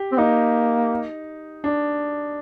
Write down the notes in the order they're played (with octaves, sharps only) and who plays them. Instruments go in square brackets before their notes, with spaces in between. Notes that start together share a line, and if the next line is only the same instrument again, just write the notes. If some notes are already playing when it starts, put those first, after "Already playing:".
Already playing: [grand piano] G4
[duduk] C4
[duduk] A#3 [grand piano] D#4
[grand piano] D4